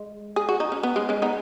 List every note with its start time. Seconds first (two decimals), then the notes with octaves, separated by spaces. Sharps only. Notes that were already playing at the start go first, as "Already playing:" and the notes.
Already playing: G#3
0.36 G#4
0.49 F#4
0.60 D#4
0.72 C#4
0.83 B3
0.96 G#3 C#4
1.09 G#3 C#4
1.22 B3 D#4